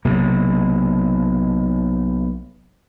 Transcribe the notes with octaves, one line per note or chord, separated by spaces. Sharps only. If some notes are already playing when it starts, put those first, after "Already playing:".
B1 C3 F#3 A#3